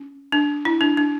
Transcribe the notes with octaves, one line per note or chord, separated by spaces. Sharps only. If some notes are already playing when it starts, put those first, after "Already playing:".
Already playing: C#4
D4
E4
D4
D4